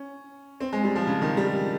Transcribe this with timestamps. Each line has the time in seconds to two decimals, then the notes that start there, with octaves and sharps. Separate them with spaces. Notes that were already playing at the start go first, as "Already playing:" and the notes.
Already playing: C#4
0.60 C4
0.73 G#3
0.84 G3
0.96 F3
1.07 C#3
1.22 D#3
1.37 G3